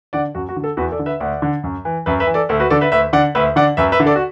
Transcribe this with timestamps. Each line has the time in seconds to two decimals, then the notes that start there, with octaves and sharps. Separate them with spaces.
0.13 D3 D5 F#5
0.35 F#2 F#4
0.49 F#4
0.56 D3
0.64 A4
0.77 E2 F#4 B4
0.92 A4 D5
0.99 D3
1.06 B4 E5
1.20 D2 D5 F#5
1.42 D3
1.64 F#2
1.85 E3
2.06 F#2 B4 E5
2.20 B4 E5
2.27 E3
2.34 A4 D5
2.49 D2 A4
2.60 F#4 B4
2.70 D3 A4 D5
2.81 B4 E5
2.92 D2 B4 E5
3.13 D3 D5 F#5
3.35 D2 B4 E5
3.56 D3 D5 F#5
3.77 F#2 B4 E5
3.92 B4 E5
4.00 D3
4.06 A4 D5
4.16 F#4